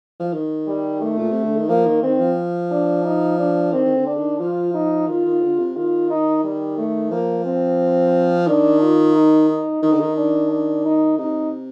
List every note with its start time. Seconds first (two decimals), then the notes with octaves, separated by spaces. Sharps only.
0.20 F3
0.33 D#3
0.67 G3
1.01 A3
1.18 A#2
1.31 C3
1.44 D3
1.56 D#3
1.69 F3 A#3
1.86 D#3
2.03 D#3 C4
2.20 F3
2.71 D4
3.04 D#4
3.38 D4
3.72 D#3 C4
3.85 D#3
3.95 D3
4.06 D4
4.17 D#3
4.40 F3 F4
4.74 D#4
5.08 D#3 F4
5.25 D#3
5.42 D3
5.59 C3
5.76 D#3 F4
6.10 D#4
6.44 G3
6.78 A3
7.11 F3 A#3
7.45 C4
8.47 D#3 D4
8.81 F4
9.15 D#4
9.49 D#4
9.83 D#3 D#4
9.92 D3
10.00 D#3
10.17 D4
10.51 D4
10.85 D#4
11.18 C3 D#4